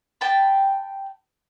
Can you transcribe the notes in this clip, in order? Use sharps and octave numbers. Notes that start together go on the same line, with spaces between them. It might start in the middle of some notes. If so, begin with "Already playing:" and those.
G5 A5 B5